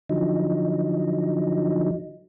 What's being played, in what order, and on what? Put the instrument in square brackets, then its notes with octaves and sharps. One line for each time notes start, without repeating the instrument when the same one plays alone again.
[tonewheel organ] D3 F3 F#3 D#4